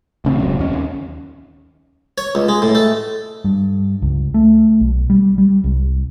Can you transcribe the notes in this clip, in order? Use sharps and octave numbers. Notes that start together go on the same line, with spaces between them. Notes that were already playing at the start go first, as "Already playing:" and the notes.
A1 C#3 C4
D1 G#1 C#2 F#2
D#2 C#4
D#2
C#5
C#2
G#3
A2
A3
G2
C#2
A3
B1
G3
G3
C2